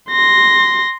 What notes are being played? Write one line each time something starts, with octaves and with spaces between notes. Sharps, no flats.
C6 A#6